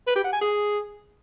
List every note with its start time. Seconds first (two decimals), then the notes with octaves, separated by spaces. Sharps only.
0.07 B4
0.16 G4
0.24 F#5
0.33 G#5
0.41 G#4